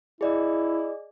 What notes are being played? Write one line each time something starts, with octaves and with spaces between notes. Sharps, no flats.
E4 G#4 D5 D#5